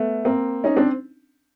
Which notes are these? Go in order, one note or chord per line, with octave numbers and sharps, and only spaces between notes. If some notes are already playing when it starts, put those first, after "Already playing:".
Already playing: A3 B3
A#3 C4
C#4 D#4
C4 D4